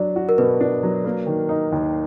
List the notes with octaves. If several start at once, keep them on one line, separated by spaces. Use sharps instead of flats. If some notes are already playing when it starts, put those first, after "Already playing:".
Already playing: F#3 D4 D5
F#4
A#4
B2 B4
D4
F#3
A#3
D#3
D#4
D#2